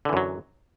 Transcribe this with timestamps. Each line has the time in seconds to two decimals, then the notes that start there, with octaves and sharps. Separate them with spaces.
0.05 D3
0.09 E3
0.13 F#2
0.17 F#3